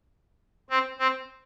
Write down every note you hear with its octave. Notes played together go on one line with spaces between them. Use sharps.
C4
C4